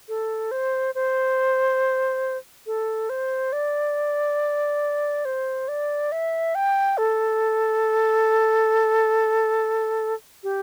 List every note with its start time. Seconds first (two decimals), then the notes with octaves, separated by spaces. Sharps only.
0.09 A4
0.51 C5
0.95 C5
2.67 A4
3.10 C5
3.53 D5
5.25 C5
5.68 D5
6.12 E5
6.55 G5
6.98 A4
10.43 G4